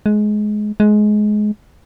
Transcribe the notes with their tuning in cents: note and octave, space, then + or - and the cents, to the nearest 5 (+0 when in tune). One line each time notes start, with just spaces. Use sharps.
G#3 +20
G#3 +20